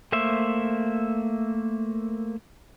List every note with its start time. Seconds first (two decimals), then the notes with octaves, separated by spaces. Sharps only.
0.12 A3 A#3 C5 E5